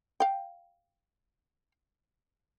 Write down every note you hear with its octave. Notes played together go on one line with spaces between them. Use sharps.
F5 G5